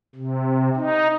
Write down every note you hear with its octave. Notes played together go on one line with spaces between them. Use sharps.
C3
D#4